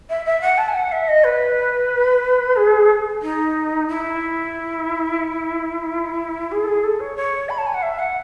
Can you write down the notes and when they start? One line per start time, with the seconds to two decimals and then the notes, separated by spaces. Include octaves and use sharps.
0.10 E5
0.25 E5
0.41 F#5
0.58 A5
0.68 G#5
0.75 F#5
0.92 E5
1.08 D#5
1.24 B4
2.56 G#4
3.22 D#4
3.88 E4
6.51 G#4
6.64 A4
6.67 G#4
6.84 A4
7.00 C#5
7.16 C#5
7.49 B5
7.58 A5
7.66 G#5
7.74 F#5
7.82 E5
7.99 F#5